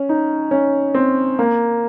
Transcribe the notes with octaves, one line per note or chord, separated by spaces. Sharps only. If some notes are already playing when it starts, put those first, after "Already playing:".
Already playing: C#4
D#4
C#4
C4
A#3